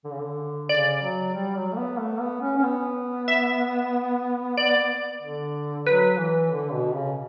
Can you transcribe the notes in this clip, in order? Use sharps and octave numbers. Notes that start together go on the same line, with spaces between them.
D3
C#3
D3
C#3 D5
F#3
G3
F#3
A3
B3
A3
B3
C#4
C#4
B3
E5
D5
D3
F#3 B4
E3
D3
B2
C#3